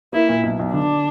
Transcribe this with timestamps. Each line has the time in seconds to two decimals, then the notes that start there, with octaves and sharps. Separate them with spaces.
0.13 A#3 E4
0.29 A#2
0.43 B1
0.59 B1
0.73 D3 D4